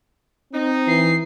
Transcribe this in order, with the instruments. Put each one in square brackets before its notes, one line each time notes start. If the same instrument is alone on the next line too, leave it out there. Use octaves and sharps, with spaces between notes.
[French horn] C4 [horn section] D#4
[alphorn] E3 [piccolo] C7